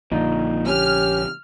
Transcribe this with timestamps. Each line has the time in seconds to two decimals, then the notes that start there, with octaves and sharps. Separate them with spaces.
0.12 A#1 A#2 D3 F3 D#4
0.67 C#4 G4 F6